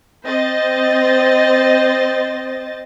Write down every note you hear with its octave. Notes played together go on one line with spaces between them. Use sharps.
C4 C5 D#5 A6